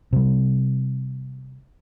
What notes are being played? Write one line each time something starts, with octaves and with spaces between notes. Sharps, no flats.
C3 G3